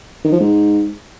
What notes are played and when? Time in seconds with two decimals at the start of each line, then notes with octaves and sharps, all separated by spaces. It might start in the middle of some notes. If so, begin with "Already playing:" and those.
0.24 D#3
0.32 F3
0.40 G#2